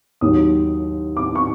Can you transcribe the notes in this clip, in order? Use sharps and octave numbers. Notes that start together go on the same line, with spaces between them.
D#2 D#3 F#3 D#6
D6
C#6